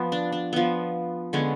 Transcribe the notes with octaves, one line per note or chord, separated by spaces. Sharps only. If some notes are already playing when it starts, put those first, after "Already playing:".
Already playing: F3 B3
D4
D4
F3 B3
D3 G#3 B3 C#4